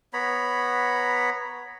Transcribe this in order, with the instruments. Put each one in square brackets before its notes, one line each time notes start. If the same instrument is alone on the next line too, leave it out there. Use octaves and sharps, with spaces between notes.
[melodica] B3 C#5 A#5 B5